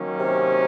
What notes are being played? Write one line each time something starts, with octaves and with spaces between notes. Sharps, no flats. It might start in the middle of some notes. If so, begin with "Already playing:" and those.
Already playing: D#3 F#3 A#3 C#4
C3